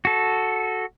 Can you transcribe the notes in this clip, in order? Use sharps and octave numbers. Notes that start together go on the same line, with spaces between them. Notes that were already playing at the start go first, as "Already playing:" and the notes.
F#4 A4